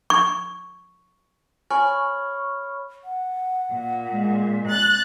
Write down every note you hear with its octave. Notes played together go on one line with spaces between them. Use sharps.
C#6
C#5 G#5 B5 C#6 F6
F#5
A#2
G#3
F#6 A6